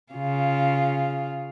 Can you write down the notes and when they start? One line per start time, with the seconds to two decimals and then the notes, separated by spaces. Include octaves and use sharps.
0.13 C#3 F4